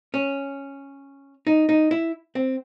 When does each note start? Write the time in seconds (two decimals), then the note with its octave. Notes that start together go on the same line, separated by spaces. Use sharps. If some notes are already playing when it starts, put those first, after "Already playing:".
0.14 C#4
1.47 D#4
1.69 D#4
1.91 E4
2.35 C4